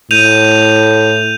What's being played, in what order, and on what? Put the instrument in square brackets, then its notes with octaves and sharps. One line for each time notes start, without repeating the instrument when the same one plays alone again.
[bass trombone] A2 [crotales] G6 D#7 F7